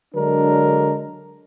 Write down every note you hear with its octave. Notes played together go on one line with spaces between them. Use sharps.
D3 F#3 G#3 D4 A#4